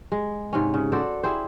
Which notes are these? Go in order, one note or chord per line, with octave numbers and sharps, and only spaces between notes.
G#3
G#2 C3 C#4
C#3
F#4 A4 C5 D5
E4 G4 G#4 C5